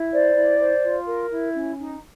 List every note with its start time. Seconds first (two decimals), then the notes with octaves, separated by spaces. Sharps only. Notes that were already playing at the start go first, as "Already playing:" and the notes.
Already playing: E4
0.11 C5 D5
0.35 E4
0.58 C5
0.83 F4
1.07 A#4
1.30 E4
1.54 C#4
1.78 D#4